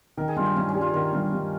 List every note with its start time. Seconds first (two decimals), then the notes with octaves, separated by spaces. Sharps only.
0.17 D#3 A#4
0.28 G#4
0.36 G2 F4
0.46 D#4
0.56 G2 C#4
0.69 C#4
0.75 G3
0.81 F4
0.93 D#3 A#4
1.12 G2
1.32 G2